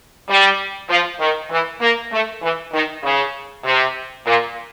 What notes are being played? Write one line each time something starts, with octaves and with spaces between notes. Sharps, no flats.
G3
F3
D#3
E3
A#3
A3
E3
D#3
C#3
C3
A#2